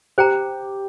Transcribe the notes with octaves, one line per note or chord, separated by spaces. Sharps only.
G4 C5 G5 A#5